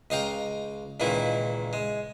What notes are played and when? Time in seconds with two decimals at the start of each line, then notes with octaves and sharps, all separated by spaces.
0.10 C#2 D#5 F5 G5 A#5
1.00 C#2 A#2 D#3 E3 A#3 E4
1.73 G#3